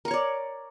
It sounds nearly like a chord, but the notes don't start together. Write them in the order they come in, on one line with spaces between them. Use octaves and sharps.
A#4 C#6 C#5 D5